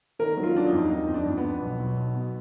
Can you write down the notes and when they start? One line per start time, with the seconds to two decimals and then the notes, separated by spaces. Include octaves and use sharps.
0.19 D#3 A#4
0.37 F#3
0.43 F4
0.55 F#3 D4
0.66 D#4
0.73 F2
0.90 F2 D#4
1.07 F2 D#4
1.14 D4
1.26 F2
1.37 B3
1.43 F2
1.61 B1
1.79 B1
1.97 B1
2.14 B2